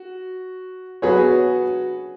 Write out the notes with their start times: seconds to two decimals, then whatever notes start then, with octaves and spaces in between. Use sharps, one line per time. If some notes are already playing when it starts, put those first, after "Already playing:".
Already playing: F#4
1.02 F#3 B3 F#4 G#4 B4 C#5